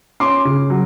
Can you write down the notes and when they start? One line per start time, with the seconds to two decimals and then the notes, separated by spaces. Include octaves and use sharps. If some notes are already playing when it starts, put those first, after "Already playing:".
0.20 C#4 C6 D6
0.45 C#3
0.70 F#3